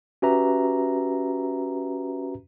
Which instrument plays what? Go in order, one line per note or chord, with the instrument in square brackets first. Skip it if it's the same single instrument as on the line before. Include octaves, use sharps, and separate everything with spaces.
[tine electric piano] C#4 F#4 G4 B4 E5 A#5